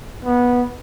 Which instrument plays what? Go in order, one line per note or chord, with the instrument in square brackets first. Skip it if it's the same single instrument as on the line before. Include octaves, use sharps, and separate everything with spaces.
[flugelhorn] B3